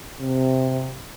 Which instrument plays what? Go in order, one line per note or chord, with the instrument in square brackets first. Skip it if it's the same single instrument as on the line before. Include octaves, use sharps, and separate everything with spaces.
[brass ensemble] C3